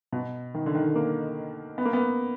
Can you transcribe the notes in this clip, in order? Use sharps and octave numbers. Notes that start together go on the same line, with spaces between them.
B2
D#3
D3
D#3
A#3
B3
A#3
B3